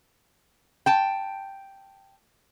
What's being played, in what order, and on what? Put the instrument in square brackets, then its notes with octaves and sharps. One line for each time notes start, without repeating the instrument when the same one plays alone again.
[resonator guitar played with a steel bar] G5 A5